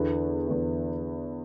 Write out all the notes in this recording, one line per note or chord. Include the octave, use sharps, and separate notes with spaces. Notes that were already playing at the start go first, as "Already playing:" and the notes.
Already playing: E2 D3 B3 E4
E2 D3 B3 E4